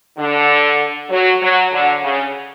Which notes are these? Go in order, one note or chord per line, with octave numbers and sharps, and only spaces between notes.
D3
F#3
F#3
D3
C#3